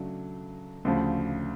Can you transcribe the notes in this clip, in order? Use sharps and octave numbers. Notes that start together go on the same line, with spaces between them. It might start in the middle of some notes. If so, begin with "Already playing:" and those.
Already playing: C#3 F#3 A3 D4
D2 C#3 F3